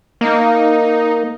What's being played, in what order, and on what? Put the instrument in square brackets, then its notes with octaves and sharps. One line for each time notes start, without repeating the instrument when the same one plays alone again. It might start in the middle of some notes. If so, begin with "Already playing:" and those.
[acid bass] A#3 [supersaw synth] D#4